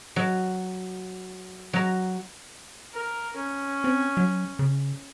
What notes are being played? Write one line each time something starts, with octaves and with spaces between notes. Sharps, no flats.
F#3
F#3 A#5
A#4
C#4
C4
F#3
C#3